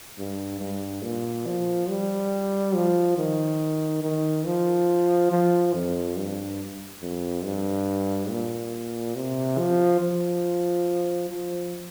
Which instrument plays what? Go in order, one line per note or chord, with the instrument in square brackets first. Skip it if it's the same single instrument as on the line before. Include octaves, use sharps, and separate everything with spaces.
[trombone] G2
G2
A#2
F3
G3
F3
D#3
D#3
F3
F3
F2
G2
F2
G2
A#2
C3
F3
F3
F3